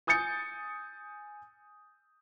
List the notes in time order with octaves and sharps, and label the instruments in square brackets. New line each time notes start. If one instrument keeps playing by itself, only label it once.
[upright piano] G#5 D#6 G6 A6 C#7